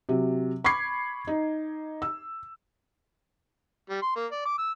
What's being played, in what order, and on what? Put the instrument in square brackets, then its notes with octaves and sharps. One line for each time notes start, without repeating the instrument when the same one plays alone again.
[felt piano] C3 F#3
B5 C#6 D6 G#6 C7
D#4
E6
[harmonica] G3
C6
A#3
D5
D6
E6